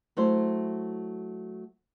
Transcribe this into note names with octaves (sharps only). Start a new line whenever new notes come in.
F#3 A3 E4 C5